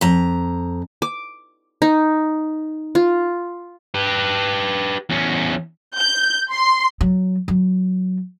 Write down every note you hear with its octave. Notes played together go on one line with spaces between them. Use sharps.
F2 A#5
D6
D#4
F4
G4 B4
E2 C#4
G6
C6
F#3
F#3